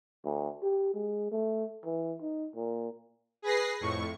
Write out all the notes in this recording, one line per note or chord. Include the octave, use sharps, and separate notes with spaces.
D2
G4
G#3
A3
E3
D#4
A#2
G#4 B4 A#6 C7
F2 A2 C#6